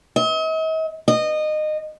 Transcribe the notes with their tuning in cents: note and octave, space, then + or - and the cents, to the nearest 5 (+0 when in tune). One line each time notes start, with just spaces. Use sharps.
D#5 +45
D#5 -20